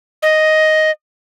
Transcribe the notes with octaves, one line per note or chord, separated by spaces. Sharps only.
D#5